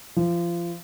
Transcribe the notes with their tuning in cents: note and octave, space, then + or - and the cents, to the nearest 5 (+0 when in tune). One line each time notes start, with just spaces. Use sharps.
F3 -25